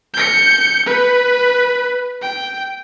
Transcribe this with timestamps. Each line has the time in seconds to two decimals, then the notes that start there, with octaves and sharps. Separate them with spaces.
0.14 G6 C#7
0.85 B4
2.22 G5